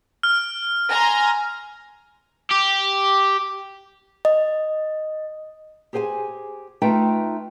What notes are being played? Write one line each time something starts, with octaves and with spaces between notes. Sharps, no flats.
F6
G#5 A#5 C6
G4
D#5
G4 G#4 C5 G5 G#5
A3 D#4 F4 B4 E5 G5